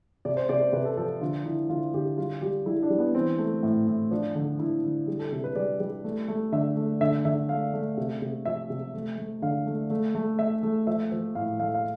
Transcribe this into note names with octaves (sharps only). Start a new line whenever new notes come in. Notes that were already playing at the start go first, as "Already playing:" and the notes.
C3 D5
C5
C3 D5
C5
C3 B4
A4
F3 A4
D3 F4
D3 E4
D3 F4
D3 G4
G3 F4
G3 G4
G3 E4
D4
G3
B3
E3 C4
A3
A2
A2
F3 D4
D3
D3 E4
D3
G3
A4
C3 A4
B4
G3 D5
G3
A3
A3
D3 E5
A3
D3 E5
D3 E5
A3 F5
A3
C3
C3
F3 E5
C3
A3
A3
D3 F5
A3
A3
A3
A3 E5
A3
F3 E5
F3
A2 F5
A3 F5
F5